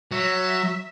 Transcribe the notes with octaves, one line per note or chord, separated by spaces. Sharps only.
F#3 E5